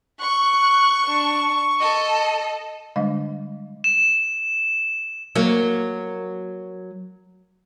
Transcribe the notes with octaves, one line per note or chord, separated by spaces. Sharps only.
C#6 F#6
D4
A4 D#5
D3 G3 G#3 D4 D#5 F5
E7
F#3 A#3